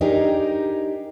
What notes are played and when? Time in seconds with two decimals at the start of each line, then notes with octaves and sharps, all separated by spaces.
0.01 D4 D#4 G4 G#4 A#4